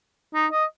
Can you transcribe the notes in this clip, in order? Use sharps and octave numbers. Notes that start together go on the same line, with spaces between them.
D#4
D#5